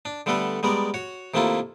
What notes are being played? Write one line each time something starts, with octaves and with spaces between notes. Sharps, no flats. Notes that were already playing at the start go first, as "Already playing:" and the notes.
D4
D3 G3 A3 B3 A4 B4
G3 G#3 B3 A#4 D5
F#4 C#5
C3 D#3 A3 A#3 E4 F4